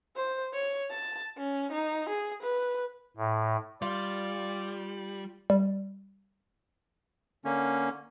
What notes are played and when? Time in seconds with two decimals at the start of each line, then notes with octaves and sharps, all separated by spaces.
0.17 C5
0.53 C#5
0.91 A5
1.37 C#4
1.72 D#4
2.09 G#4
2.43 B4
3.17 A2
3.82 G3 F4 D5
5.50 G3
7.45 D3 A#3 C#4